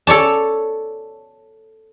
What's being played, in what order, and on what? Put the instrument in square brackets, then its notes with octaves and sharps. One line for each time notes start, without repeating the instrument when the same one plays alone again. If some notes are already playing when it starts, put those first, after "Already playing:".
[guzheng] A4 C#5 D5 A5